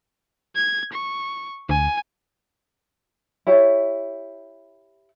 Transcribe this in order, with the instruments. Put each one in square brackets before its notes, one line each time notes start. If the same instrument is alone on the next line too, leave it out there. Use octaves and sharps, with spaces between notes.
[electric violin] G#6
C#6
[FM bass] D2 [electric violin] G#5
[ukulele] E4 G4 C#5 E5